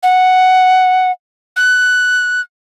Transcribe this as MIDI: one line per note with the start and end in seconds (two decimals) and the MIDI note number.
0.03 1.11 78
1.57 2.41 90